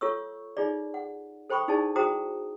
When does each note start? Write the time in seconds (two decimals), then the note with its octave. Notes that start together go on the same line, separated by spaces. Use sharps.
0.01 F4 A4 C#5 C#6 E6
0.57 D#4 F4 G#4 D5
0.94 F#5
1.50 A4 C5 G5 B5 C#6 D#6
1.68 D#4 E4 G#4 D5 A5 C#6
1.96 F#4 G#4 C5 G5 A#5 D#6